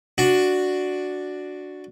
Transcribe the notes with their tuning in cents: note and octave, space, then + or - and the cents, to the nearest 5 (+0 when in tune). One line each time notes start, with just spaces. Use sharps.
D4 +0 F#4 +0